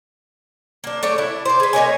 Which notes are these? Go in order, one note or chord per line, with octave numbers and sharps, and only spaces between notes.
A#3 D4
A3 C#5 D5
D4 E4
C5 D5
G#4 B4
A#3 D#4 C#5 G#5